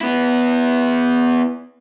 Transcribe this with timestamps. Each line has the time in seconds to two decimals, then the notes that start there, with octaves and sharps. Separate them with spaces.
0.01 B3 E4